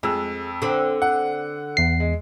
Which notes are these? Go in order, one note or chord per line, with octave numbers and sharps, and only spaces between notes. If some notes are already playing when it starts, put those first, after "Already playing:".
F2 G#3 E6
D3 C4
F#5
E2 C7
G#3